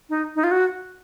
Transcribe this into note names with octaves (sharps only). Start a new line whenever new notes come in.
D#4
D#4
F4
F#4